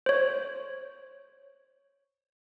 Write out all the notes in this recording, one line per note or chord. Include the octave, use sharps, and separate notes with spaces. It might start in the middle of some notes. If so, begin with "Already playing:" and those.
C5 C#5